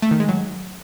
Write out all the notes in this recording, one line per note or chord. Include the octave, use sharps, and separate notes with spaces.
A3
D#3
G#3
F#3